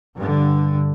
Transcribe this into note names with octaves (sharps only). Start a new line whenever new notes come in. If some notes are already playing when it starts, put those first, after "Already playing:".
G2 D3